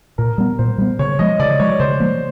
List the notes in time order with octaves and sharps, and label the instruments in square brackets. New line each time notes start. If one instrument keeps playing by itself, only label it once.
[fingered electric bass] A#2 [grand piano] A#4
[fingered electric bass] G3 B3
[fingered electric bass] A#2 [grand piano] C5
[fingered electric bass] G3 B3
[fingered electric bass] C#3 [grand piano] C#5
[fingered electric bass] F3 G#3 [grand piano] D#5
[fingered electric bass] C#3 [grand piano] D5
[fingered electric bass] F3 G#3 [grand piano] C#5
[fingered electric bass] C#3 [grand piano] C5
[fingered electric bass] E3 G3 A#3